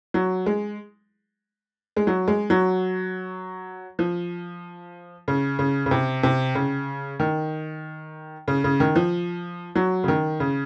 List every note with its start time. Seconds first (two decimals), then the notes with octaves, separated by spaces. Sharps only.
0.14 F#3
0.46 G#3
1.97 G#3
2.07 F#3
2.28 G#3
2.50 F#3
3.99 F3
5.28 C#3
5.59 C#3
5.86 C#3
5.91 C3
6.23 C3
6.55 C#3
7.20 D#3
8.48 C#3
8.64 C#3
8.80 D#3
8.95 F3
9.75 F#3
10.04 C#3
10.08 D#3
10.40 C#3